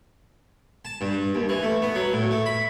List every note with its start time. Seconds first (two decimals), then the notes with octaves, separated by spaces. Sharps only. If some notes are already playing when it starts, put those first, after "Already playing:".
0.85 A5
1.01 G2
1.35 D#2
1.49 E3
1.63 A3
1.82 B3
1.95 F#3
2.13 A2
2.31 A3
2.46 B5